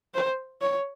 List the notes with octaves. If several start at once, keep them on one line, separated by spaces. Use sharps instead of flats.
C5
C#5